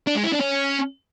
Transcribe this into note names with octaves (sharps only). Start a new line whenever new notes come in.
D4
G#3
E4
D4
C#4